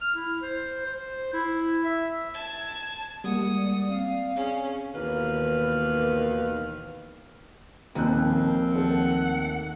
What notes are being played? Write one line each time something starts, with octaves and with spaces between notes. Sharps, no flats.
F6
E4
C5
C5
E4
E5
A5 G#6
G3 G#3 A#3 F#5 D#6
D5
C4 F5
C#4 G#4
D#2 B2 D#3 E3 B4 F5
D#1 D#2 D#3 F3 C4 F#6
A3 A4 F#5